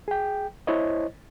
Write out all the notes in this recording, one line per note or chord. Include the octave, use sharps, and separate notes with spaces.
G#4 G5
E4 C5 C#5 D#5